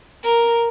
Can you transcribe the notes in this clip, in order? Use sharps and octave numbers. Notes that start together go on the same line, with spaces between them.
A#4